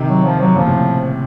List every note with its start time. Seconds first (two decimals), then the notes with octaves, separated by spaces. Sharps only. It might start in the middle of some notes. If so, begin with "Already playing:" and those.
Already playing: C3 D#3
0.09 F#3
0.24 F3
0.40 F#3
0.55 A#2 C#3 F3
0.67 A2 C3